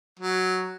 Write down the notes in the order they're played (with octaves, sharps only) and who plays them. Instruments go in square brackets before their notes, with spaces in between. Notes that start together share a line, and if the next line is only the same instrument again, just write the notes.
[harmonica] F#3